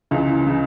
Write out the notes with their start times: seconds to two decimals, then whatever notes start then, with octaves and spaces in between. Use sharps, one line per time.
0.11 C#2 C#3 E3
0.47 C#3 E3